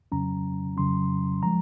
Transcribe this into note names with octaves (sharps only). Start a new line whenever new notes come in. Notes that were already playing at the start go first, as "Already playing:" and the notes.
F2 C#3 F#3 C#4 A#5
F2 C#3 F#3 C#4 C6
F3 G#3 A#5